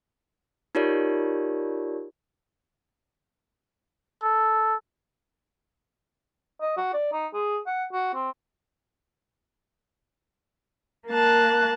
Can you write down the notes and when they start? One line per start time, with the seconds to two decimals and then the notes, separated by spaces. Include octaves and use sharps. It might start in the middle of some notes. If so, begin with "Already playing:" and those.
0.75 D#4 F4 G4 A#4 C#5 D5
4.23 A4
6.61 D#5
6.77 F#4
6.94 D5
7.13 D#4
7.33 G#4
7.67 F#5
7.93 F#4
8.15 C4
11.08 A#3 A5 F#6